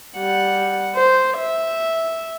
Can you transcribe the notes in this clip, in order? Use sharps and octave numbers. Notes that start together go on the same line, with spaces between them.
G3 F#5
C5
E5